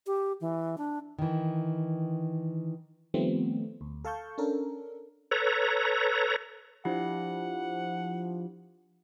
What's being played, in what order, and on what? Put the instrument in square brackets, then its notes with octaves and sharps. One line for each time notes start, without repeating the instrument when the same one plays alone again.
[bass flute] G4
E3
D4
[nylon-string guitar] D#3 E3
[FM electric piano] D#3 F3 G3 A3 B3 C4
D2
A4 F5 A5 C#6 G6
C#4 D4 A4 A#4
[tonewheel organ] A4 B4 C#5 A#5
[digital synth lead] F3 [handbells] D4 E4 G4 [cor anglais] F#5